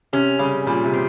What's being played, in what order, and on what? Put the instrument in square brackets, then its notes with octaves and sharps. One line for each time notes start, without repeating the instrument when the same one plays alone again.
[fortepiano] C3 [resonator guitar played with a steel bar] C#4
[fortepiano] C#3 [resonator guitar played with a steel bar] G3
[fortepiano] A#2 [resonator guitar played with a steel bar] G3
[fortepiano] C3
[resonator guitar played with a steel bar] C4